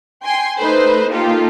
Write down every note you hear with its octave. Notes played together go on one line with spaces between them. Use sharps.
G5 G#5 C6
A3 D#4 A4 B4 C5
A#3 D#4 F4 G4 A4